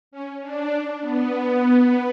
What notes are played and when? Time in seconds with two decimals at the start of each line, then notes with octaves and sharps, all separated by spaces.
0.11 C#4
0.42 D4
1.01 B3